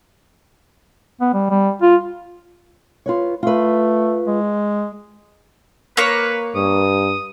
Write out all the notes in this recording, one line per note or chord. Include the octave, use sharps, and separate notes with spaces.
B3
G3
G3
F4
F4 B4 C#5
A3 F4 B4
G#3
A#3 B4 C#5
G2 D#6